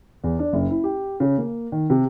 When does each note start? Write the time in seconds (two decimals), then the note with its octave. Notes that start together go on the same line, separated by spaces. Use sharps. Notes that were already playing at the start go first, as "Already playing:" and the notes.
0.24 E2
0.39 D4
0.53 F#1
0.70 E4
0.84 G4
1.20 C#3
1.38 A#3
1.72 D#3
1.90 C3